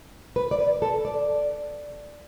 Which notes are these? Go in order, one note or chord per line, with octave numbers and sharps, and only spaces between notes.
B4
D5
B4
A4
D5